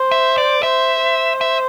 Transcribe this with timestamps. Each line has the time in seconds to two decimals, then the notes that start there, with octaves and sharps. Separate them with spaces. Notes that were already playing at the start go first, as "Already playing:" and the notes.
Already playing: C5
0.11 E5
0.38 D5
0.63 C5 E5
1.02 C5
1.41 E5